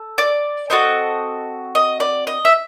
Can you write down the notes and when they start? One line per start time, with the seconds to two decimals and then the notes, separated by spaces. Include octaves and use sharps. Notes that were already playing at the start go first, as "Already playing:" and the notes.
Already playing: A4
0.18 D5
0.70 C4 D#4 F#4 A4 D#5
1.75 D#5
2.00 D5
2.27 D#5
2.45 E5